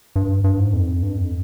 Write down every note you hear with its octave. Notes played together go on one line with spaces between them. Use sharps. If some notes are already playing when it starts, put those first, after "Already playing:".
G2
G2
G#2
F2
G2
F2